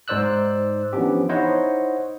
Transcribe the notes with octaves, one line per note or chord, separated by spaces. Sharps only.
G#2 D#4 C5 D5 E6 F#6
E3 F3 B3 C#4 D4 G4
D#4 E4 C5 C#5 D#5 F#5